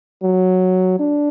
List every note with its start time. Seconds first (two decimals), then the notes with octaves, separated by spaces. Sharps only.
0.23 F#3
1.00 D4